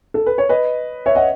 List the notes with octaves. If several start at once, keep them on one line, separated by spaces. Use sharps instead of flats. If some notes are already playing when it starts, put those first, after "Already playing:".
A4
B4
C#5
B4 D#5
C#5 E5
D#5 F#5